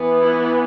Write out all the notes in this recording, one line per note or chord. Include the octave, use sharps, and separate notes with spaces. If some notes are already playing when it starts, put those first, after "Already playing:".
Already playing: E3 B3
E4